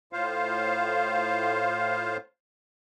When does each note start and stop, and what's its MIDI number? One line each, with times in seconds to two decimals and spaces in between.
0.13 2.17 45
0.13 2.17 65
0.13 2.17 72
0.13 2.17 77